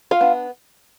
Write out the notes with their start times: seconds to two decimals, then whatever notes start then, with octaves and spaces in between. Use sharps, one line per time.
0.11 F4 F5
0.21 B3 D4